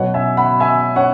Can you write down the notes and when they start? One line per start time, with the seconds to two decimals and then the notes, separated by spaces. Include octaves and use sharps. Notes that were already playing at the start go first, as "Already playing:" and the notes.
Already playing: B2 F#3 B3 C#5 F#5
0.14 E5 G#5
0.37 F#5 B5
0.60 E5 G#5
0.96 C#5 F#5